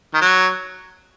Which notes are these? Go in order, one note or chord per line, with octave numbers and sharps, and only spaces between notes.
D#3
F#3